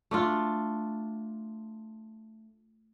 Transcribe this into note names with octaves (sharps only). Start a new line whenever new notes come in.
A3 D4 F4